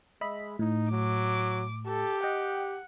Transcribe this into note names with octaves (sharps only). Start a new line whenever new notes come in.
G#3 D#5 E5 B5
A2 D#4
F#3 D6
G4 A4
D#5 F#5 G5